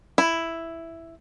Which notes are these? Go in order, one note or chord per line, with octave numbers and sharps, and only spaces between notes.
E4